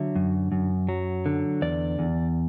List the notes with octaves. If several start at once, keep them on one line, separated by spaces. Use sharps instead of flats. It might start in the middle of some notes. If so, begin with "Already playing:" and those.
Already playing: D3 F#3 E5
F#2
F#2
F#3
D3
E2 D5
E2